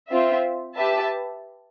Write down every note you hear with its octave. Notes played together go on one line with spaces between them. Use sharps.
C4 F4 C5 E5
G4 B4 E5 A5